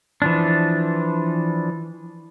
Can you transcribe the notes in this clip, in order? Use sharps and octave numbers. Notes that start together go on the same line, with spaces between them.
E3 F3 D4